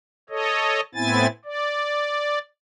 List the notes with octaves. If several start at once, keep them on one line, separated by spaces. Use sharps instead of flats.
A4 C#5 D#5
A2 B3 C4 E4 G#5 A6
D5